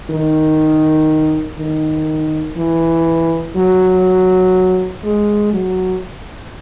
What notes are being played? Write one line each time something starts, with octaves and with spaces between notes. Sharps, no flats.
D#3
D#3
E3
F#3
G#3
F#3